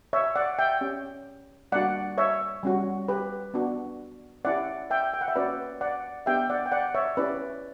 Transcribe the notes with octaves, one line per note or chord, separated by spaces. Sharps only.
C#5 E5
D5 F#5
E5 G5
C#4 G4
G3 A#3 D4 F#4 D5 F#5
C#5 E5
G3 C#4 F#4
G4 B4
B3 D4 F#4
C#4 E4 G4 D5 F#5
E5 G5
G5
F#5
E5
A#3 C#4 F#4 B4 D5
D5 F#5
B3 D4 G4 E5 G5
D5 F#5
G5
D5 F#5
C#5 E5
C#4 E4 G4 B4 D5